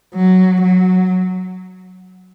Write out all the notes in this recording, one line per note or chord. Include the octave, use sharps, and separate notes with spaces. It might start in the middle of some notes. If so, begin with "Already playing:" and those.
F#3
F#3